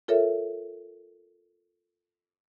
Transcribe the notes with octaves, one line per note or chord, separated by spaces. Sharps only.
F4 A4 A#4 C#5 E5